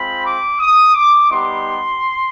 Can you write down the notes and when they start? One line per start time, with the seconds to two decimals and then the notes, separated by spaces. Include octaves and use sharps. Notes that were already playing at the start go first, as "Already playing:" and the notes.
Already playing: G#3 C4 F4 B5
0.24 D6
0.59 D#6
0.94 D6
1.30 G3 B3 D#4 G4 C6